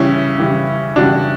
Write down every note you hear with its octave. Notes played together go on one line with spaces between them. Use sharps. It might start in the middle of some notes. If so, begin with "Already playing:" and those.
Already playing: C#3 E3 G3 C#4 E4
C#3 E3 G3
C#3 E3 G3 D4 F#4